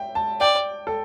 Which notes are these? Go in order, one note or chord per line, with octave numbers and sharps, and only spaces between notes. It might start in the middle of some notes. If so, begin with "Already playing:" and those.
Already playing: E5 G5
A5
D5 G5
A4